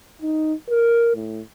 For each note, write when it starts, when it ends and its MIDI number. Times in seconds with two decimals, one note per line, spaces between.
0.22 0.53 63
0.69 1.13 70
1.16 1.41 45